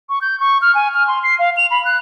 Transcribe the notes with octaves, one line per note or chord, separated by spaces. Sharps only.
C#6
G6
C#6
F6
G#5
F6
C6
C7
F5
F7
B5
F#6